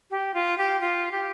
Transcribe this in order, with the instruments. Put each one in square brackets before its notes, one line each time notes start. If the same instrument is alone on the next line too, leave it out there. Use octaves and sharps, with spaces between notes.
[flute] G4
F4
G4
F4
G4